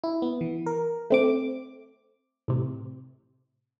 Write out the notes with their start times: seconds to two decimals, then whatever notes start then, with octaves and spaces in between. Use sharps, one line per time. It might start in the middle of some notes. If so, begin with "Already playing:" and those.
0.04 E4
0.22 B3
0.41 E3
0.66 A#4
1.10 A3 C4 D6
2.48 A2 C3